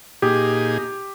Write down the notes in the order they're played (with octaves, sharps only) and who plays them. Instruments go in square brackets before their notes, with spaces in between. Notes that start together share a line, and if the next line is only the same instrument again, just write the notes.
[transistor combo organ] A#2 D#4 G#4 [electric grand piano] G4